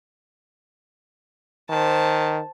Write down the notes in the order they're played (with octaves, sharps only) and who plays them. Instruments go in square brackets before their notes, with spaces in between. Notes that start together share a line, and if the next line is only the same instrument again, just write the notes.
[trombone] D#3 [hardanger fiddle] C5 A5